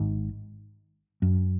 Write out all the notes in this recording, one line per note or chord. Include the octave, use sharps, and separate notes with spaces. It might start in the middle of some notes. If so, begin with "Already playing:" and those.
Already playing: G#1 G#2
F#2